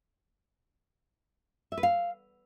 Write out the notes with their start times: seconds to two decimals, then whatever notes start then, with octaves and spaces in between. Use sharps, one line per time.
1.72 E5
1.78 B4
1.83 F5